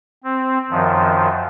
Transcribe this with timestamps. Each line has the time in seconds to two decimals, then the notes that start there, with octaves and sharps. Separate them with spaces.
0.24 C4
0.70 F#2 D#3 F3